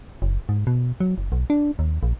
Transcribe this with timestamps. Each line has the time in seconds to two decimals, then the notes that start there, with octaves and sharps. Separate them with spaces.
0.22 F#1
0.49 G#2
0.67 B2
1.00 F#3
1.18 F#1
1.32 B1
1.50 D4
1.79 D#2
2.03 A#1